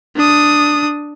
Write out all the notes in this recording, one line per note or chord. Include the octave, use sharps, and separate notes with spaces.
D4 D#6